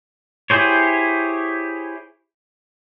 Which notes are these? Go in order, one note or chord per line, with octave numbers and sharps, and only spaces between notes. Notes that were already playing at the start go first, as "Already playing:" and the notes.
E4 G4 G#4 C5 C#5